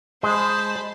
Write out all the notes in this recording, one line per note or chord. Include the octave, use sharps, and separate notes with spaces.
G#3 C5 A5 B5